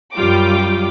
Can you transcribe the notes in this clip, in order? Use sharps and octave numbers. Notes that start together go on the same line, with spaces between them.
F#2 G3 F4 G5 D6